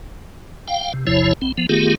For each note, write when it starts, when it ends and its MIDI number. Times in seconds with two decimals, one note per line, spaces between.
0.68 0.93 77
0.68 0.93 79
0.93 1.06 48
1.07 1.33 33
1.07 1.33 40
1.07 1.33 48
1.07 1.33 53
1.07 1.33 64
1.07 1.33 73
1.42 1.52 35
1.42 1.52 60
1.58 1.67 53
1.58 1.67 59
1.69 1.95 51
1.69 1.95 57
1.69 1.95 59
1.69 1.95 65
1.69 1.95 67
1.69 1.95 68